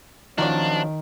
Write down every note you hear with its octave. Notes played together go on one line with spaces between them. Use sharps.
D#3 F3 F#3 A#3 C#4 D4 F#4 D5